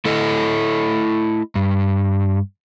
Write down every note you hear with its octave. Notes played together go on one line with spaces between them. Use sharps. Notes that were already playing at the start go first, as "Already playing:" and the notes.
A3 E4 A4 D#5
G2